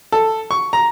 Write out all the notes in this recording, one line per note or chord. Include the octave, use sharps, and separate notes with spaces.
A4
C#6
A#5